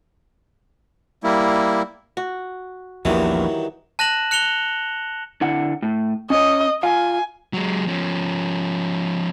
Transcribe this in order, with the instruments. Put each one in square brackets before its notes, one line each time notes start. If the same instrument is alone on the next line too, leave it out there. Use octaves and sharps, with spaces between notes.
[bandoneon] G3 A#3 E4
[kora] F#4
[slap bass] A#1 E2 A#2 [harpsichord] G2 D#3 F#3 [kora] E3
[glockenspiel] A5 F#6 A#6 E7 F#7
F#6 C#7 F7 G7
[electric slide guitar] D3 E4 F#5
A2
[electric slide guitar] C#4 C#5 [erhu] D#5
[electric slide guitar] F4 F5 [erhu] G#5
[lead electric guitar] F#3 G#3
F3 C#4